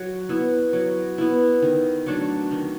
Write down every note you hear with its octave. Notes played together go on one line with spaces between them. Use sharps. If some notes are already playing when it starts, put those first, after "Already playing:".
Already playing: F#3
B3 E4
F#3
B3 E4
D#3
F#3 A3 D4
D#3